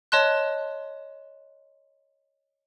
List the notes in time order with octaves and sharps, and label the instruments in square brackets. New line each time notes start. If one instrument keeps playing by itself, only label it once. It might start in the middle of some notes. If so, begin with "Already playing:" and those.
[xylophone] C#5 D#5 A5 C6 F#6